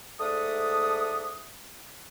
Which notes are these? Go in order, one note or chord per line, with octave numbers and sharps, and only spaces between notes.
G#2 A3 D5 E5 F#5 D#6